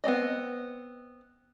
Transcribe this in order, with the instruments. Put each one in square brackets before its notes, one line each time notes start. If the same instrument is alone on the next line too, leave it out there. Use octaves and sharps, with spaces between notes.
[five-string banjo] B3 C4 D5 D#5